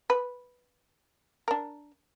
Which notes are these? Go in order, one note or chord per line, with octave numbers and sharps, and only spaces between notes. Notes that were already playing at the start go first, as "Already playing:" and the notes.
B4
D4 A#4